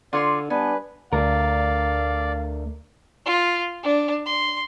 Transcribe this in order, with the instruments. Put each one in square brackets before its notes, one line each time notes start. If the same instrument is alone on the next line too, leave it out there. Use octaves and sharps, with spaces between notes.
[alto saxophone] D3 [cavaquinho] F4 C#5 C6 [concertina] D5
[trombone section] G3 D4 [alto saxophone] B3 [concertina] B4 [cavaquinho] G#5
[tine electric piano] D2 [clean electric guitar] A3 D4 A#4 [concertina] D5 [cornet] F5
[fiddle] F4
D4
C6